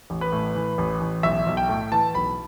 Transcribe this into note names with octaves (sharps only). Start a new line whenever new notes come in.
A1
B4
A2
E3
A1
A1
B1 E5
B1
G5
A2
E3 A5
B1 B5